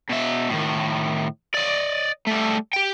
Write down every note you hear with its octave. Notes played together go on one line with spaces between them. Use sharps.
B2 E5
A2 D#3
D5 D#5
G3 A3
G4 G5